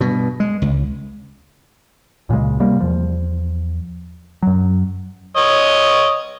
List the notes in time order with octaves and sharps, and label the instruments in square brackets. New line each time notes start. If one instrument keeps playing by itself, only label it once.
[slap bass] G2 B2
G#3
C#2
[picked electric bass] C#2 A#2 C#3 G#3
C3 G3 A#3
E2 F3
F#2 F#3
[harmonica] C#5 D#5